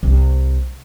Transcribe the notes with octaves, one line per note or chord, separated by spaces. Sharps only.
C2